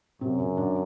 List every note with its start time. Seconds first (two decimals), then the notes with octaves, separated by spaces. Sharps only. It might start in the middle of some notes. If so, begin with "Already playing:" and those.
0.21 F#2 C3 C4
0.39 C#3 C#4
0.57 D3 D4